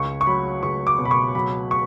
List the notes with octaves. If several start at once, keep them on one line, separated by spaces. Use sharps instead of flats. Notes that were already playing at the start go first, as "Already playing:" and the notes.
Already playing: C#2 C#6
C#6
F#3 B5
C#2 C#6
D6
B2
B5
C#6
F#3 B5
C#6